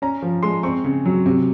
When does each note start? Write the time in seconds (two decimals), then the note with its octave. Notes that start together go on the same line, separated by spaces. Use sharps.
0.02 C#4 A#5
0.22 F3
0.43 G#3 C6
0.63 C4 C#6
0.84 C#3
1.05 F#3
1.26 C3